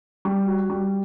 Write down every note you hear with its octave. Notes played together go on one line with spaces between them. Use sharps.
G3
F#4
G3